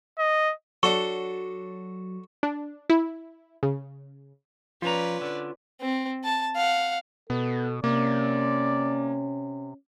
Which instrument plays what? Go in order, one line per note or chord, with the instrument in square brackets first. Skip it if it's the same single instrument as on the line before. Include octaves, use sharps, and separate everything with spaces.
[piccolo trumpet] D#5
[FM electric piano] F#3 [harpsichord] D4 F#4 A4 [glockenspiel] C#6
[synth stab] D4
E4
C#3
[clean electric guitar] F3 A#5 [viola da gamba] C#4 B4 D5 [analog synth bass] F4
[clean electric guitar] D3
[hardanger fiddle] C4
A5
F5 F#5
[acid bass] B2 [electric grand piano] B3 [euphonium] A4
[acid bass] C3 [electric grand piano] A#3 [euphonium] C#4 [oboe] D5